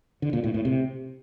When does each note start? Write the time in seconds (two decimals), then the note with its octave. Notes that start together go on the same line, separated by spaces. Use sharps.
0.22 D3
0.33 A#2
0.44 A2
0.54 A2
0.65 C3